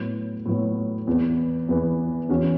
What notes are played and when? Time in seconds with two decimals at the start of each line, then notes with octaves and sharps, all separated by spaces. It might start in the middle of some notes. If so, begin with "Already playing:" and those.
Already playing: A2 F#3 B3
0.46 A2 F#3 B3
1.07 E2 E3 B3
1.69 E2 E3 B3
2.29 E2 E3 C#4 F#4